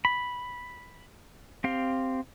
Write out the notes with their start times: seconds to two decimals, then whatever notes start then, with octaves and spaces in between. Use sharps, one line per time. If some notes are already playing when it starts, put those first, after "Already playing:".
0.05 B5
1.64 C4 G4 F5